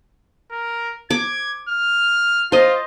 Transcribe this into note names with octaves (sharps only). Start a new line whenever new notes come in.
A#4
D6 G#6
F6
F4 C5 D#5